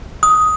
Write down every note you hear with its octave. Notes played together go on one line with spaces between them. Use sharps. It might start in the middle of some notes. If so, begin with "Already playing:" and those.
D#6